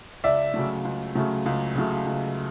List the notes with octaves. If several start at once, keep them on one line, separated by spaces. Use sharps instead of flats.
C#2 D5 E5
C#3 F#3 A3
C#2
C#3 F#3 A3
C#2
C#3 F#3 A3
C#2